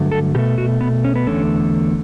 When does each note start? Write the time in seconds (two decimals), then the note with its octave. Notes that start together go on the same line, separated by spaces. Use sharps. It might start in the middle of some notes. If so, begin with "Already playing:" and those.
Already playing: G2 D3 F#3 A3
0.12 A4
0.35 B2 G4
0.39 A3
0.58 F#4
0.81 B3
1.04 C#4
1.16 B3
1.27 E2 D3 A3 C#4